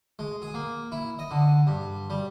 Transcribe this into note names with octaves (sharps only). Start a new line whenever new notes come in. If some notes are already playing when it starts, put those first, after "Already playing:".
G#3
G#4
A#3
E4
D#5
D3
G2
G3